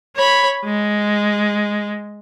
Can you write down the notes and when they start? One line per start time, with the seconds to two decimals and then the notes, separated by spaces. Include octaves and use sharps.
0.16 C#5 B5
0.64 G#3